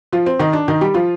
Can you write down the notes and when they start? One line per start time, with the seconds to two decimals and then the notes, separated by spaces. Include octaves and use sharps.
0.13 F3 F4
0.26 C4
0.39 D#3 D#4
0.53 D4
0.68 D#3 D#4
0.81 G3 G4
0.94 F3 F4